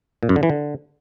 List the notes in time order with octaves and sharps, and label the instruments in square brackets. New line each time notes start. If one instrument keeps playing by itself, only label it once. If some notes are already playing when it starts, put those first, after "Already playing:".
[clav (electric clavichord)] A#2
F#2
D3
E3
D3